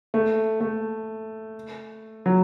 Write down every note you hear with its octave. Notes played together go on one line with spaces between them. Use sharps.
A3
A3
F#3